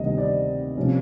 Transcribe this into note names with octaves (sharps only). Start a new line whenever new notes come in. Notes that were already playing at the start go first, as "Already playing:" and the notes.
Already playing: D2 C3 D#3 G3 B3 D#5
D5
C3 F3 A#3 C#4